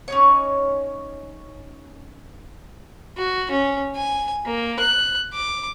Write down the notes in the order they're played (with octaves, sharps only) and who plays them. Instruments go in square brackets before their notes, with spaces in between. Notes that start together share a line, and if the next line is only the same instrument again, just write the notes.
[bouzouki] C#4 D#4 C#5
[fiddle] F#4
C#4
G#5
A#3
F#6
D6